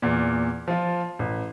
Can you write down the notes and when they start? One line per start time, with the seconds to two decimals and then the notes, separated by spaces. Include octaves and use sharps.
0.02 E2 A#2
0.68 F3 F4
1.19 A1